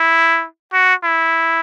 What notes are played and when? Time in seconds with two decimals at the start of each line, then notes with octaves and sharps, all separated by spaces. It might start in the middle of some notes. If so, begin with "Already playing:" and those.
Already playing: E4
0.73 F#4
1.04 E4